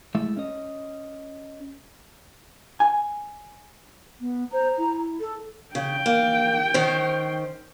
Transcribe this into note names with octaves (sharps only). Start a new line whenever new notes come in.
G#3 A3 E4 E5
C#4 D#5
G#5
B3
C5 A#5
E4
A4
C#3 G5
A#3
D#3 C#4 C5